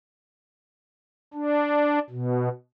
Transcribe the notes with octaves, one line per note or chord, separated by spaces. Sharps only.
D4
B2